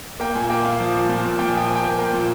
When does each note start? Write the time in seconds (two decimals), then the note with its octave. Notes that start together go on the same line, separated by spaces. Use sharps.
0.20 A#3 G5
0.35 A#2 G#5
0.50 A#3 G5
0.64 A#2 F5
0.80 F3
0.95 A#2
1.09 A#2
1.24 A#2
1.39 A#2 G5
1.49 G#5
1.54 F3 G5
1.68 F3 G#5
1.76 G5
1.84 A#3
1.99 A#3 G5
2.13 A#2